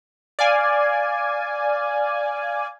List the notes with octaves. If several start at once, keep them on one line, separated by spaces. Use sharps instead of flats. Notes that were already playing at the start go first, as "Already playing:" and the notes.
D5 F5 G#5